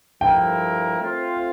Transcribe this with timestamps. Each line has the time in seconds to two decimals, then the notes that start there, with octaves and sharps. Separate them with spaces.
0.21 G2 F3 A3 E4 A#4 G5
0.99 A3 C4 F4 C5